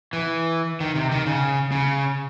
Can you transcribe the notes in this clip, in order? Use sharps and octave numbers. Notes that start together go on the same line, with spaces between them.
E3
D#3
C3
D#3
C#3
C#3